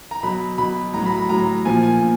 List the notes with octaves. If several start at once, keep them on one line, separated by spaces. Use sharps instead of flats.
A#5
B2 F#3 B5
B2 F#3 B5
A2 F#3 A#5
B5
B5
A2 F#3 A#5
A#2 F3 G#5
G#5
A#2